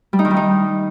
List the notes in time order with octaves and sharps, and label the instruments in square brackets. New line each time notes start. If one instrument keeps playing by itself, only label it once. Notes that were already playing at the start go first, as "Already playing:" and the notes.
[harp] G3
D#4
D#3
G3
D#4